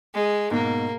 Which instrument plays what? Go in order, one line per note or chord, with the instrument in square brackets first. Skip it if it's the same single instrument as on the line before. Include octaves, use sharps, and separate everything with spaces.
[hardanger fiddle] G#3
[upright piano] G#2 B2 [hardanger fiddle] A#3